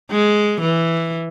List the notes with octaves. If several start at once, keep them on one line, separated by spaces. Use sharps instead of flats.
G#3
E3